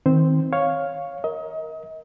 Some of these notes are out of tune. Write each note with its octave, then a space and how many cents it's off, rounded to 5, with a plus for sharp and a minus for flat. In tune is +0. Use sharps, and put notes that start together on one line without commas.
D#3 +25 C4 +0 C5 -5
C#5 +0 F5 +5
A#4 +10 D#5 +35